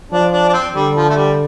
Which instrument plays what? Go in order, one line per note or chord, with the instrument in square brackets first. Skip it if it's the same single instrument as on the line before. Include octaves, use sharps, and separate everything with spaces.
[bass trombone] F3 [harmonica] D4
[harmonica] D4
D4
C4
[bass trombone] D3 [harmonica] G3
[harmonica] F3
A3
G3